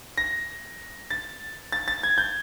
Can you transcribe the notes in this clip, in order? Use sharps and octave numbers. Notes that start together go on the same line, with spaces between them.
A#6
A6
A6
A6
G#6
G6